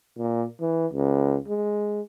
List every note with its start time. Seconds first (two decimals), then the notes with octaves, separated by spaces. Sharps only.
0.18 A#2
0.61 E3
0.93 C#2
1.48 G#3